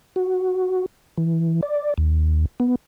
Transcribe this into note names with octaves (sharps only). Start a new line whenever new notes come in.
F#4
E3
D5
D#2
B3